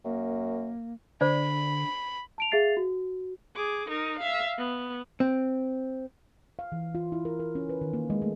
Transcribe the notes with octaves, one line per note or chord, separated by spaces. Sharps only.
F#2 A#3
D3 D4 C5 D5 B5
A5 D7 F7
G#4 E5 F5 A6 C7 F7
F#4
G#4 D6
D#4 A#4
E5 F5
B3
C4
F5
E3
F4
E4
A#4
A#4
C#4
B4
D#3
A#3
G#3
A3